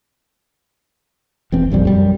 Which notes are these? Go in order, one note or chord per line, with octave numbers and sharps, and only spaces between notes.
E1 E3 C4
F1 A#1 F2 G3
F#2 G3